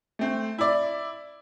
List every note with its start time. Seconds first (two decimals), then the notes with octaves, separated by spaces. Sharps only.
0.19 A3 C4
0.58 E4 D5